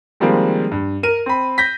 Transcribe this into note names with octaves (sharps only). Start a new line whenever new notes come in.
D#3 F3 G3 G#3 A#3 C4
G2
A#4 D#7
C4 B5
G6 A#6 B6